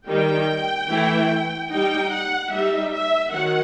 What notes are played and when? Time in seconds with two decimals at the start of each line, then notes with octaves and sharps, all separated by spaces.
0.08 D#3 G3 D#4 G5
0.90 E3 A3 E4
1.71 G3 D#4 G5
2.12 F#5
2.52 G3 D#4 E5
2.93 E5
3.32 D#3 F#3 F#5